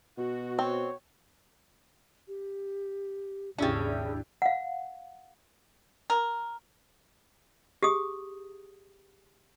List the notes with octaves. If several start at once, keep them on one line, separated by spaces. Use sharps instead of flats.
B2 F#4
C4 C#5
G4
G#1 D#2 C#3 C#4 D4 E4 G4 G#4
F5 F#5
A#4
G4 G#4 D#6